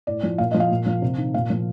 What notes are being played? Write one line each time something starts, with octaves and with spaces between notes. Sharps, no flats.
A2 D5
F3
A#2 F5
F3 D#5
F5
A#2
F3
C3
D#3
A#2 F5
F3